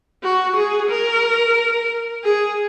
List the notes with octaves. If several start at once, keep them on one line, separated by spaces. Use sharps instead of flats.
F#4
G#4
A#4
G#4